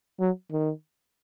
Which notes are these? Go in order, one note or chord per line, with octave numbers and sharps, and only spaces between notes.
F#3
D#3